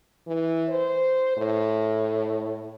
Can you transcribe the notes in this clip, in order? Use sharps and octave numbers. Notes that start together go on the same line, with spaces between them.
E3
C5
A2